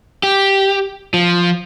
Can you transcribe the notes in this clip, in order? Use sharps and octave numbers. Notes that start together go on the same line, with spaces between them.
G4
F3